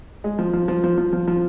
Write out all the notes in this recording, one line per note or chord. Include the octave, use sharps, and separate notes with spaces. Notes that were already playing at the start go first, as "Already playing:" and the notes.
G#3
F3
F3
F3
F3
F3
F3
F3